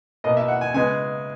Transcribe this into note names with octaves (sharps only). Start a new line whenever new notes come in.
B2 A#3 D#5
E5
F#5
G#5
C#3 G#3 B3 G#5